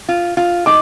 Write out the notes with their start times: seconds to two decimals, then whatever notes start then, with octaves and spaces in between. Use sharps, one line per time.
0.09 F4
0.37 F4
0.66 D#4 D6